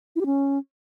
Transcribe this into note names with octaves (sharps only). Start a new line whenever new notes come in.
E4
G4
C#4